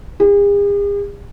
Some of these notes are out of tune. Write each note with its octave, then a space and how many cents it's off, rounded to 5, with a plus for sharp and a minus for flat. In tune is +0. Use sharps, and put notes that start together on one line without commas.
G#4 -45